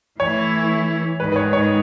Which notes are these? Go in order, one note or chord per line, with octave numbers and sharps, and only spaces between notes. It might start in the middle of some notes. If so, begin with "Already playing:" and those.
E3 A3 E4 C#5
G#2 D#3 G#3 B4
B4
C#5
C#5